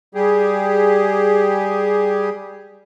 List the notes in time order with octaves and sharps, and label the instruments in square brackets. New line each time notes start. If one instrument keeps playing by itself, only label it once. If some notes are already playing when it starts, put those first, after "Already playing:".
[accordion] G3 G4 G#4